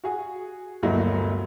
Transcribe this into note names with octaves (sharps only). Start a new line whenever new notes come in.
F#4 G#4
G1 D2 A#2 F#3 D#5 E5